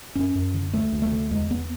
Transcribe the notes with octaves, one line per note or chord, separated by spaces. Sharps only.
F#2 C#4
F#2
D3
D2 A3
D2
A3
D3
E2 G#3
E2 B3